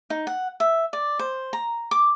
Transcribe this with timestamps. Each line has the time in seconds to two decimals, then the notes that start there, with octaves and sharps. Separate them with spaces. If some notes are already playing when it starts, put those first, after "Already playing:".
0.10 D#4
0.27 F#5
0.60 E5
0.93 D5
1.19 C5
1.53 A#5
1.91 D6